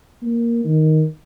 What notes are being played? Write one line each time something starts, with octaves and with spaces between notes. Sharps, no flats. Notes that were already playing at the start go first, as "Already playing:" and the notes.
A#3
D#3